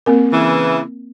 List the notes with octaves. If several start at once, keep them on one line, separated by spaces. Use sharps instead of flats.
A#3 C4 A#4
C#3 E3